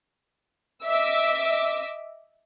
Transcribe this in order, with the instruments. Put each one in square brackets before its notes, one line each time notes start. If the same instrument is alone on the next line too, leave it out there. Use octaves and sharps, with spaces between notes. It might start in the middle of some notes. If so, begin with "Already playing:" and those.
[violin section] D#5 E5 D6 E6